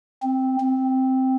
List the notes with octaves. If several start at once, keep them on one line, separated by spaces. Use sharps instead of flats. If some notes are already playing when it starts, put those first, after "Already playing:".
C4
C4